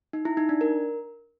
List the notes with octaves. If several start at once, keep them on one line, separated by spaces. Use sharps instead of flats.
D#4
E4
D#4
D4
A#4